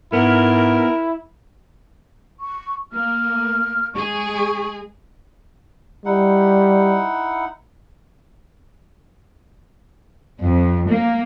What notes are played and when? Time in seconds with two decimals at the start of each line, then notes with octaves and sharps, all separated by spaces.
0.13 G#2 B3 E4 A#4
2.40 C#6
2.92 A#3 F6
3.95 G#3 G#4 C#6
6.06 G3 D#4 E4 F#5
10.42 F2
10.89 A#3